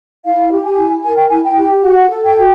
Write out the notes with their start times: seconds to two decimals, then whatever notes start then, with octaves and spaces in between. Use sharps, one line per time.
0.25 E4 F5
0.51 G4
0.64 G#5
0.77 E4
1.05 A#4 G#5
1.16 G5
1.29 E4 G#5
1.44 G5
1.57 G4
1.83 F#4 F#5
2.11 A4
2.23 G5
2.36 F#4